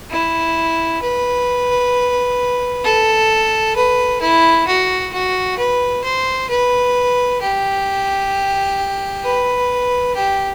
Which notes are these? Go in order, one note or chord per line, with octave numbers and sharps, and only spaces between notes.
E4
B4
A4
B4
E4
F#4
F#4
B4
C5
B4
G4
B4
G4